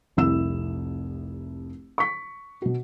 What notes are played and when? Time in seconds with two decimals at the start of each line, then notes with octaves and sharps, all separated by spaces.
0.17 F1 C2 E4 E6 E7
1.98 C#6 B6
2.62 B2 F#4